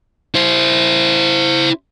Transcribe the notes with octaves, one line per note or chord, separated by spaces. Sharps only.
E4 C5